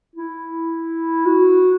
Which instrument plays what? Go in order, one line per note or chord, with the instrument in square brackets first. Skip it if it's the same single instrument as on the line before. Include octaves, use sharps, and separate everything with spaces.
[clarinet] E4
F#4